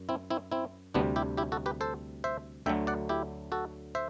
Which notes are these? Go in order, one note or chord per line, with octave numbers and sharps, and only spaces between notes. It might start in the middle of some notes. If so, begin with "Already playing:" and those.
Already playing: F#2
C4 E4
C4 E4
C4 E4
D2 C3 G3 B3 D4
E4 G4
E4 G4
F#4 A4
G4 B4
A4 C5
C5 E5
D2 D3 F#3 A3 E5 G5
D5 F#5
E4 G4
F#4 A4
C5 E5